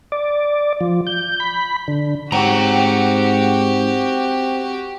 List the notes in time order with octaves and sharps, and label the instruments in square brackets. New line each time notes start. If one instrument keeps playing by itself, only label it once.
[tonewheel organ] D5
F3
G6
B5
D3
[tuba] G#2 [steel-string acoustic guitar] C4 [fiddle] F#4 G4 [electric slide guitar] F#5 A#5